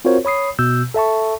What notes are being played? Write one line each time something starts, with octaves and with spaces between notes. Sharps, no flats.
C4 F4 F#4 A#4 C5 C#5
C#5 B5 D#6 C7
B2 E6 G6
A4 E5 A5 C#6